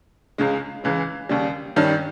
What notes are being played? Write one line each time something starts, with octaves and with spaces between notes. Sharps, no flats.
C#2 C#3 G#3
C#2 C#3 E3 G#3
D#2 C#3 G3
G2 D#3 G3 C#4